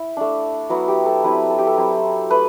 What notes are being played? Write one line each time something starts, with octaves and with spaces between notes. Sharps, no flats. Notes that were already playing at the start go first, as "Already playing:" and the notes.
Already playing: E4
A3 D4
F#3 B3 E4 F#4
G4
A4
F#3 C4 E4 B4
A4
G4
A4
F#3 C4 E4
A3 B4